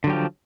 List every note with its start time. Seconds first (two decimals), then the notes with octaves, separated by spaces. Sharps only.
0.04 D3
0.07 F#3
0.10 G4
0.13 F3